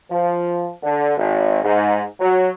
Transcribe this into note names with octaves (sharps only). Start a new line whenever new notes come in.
F3
D3
G#1
G#2
F#3